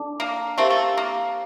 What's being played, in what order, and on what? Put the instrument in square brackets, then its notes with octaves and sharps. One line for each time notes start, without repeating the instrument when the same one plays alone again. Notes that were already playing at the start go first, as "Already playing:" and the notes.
Already playing: [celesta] D4 A4 D5 A5 D6
[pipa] A#3
[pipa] A3 C4 [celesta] G4 A#4 F5 A#5
[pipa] A3
A#3